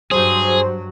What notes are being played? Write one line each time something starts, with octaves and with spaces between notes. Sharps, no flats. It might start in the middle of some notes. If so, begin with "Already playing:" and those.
G2 F#3 G#4 C5